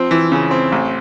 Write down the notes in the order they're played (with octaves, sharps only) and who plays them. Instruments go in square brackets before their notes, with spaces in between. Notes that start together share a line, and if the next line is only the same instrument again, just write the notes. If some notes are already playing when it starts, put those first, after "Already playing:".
Already playing: [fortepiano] F3 C4
E3
C#3
C4
A1